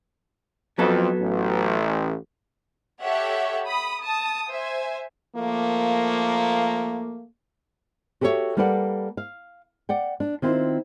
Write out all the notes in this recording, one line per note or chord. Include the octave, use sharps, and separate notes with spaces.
F2 F#3 B3 A4
A1
G4 A4 C#5 E5 F#5
B5 D#6
A5 D#6
C5 E5 G#5
F3 A3 A#3
F#4 G4 A4 A#4 C#5 E5
G3 A#3 A4 B4 D5 F#5
F5
D5 F#5 G5
D4
D#3 C4 E4 F4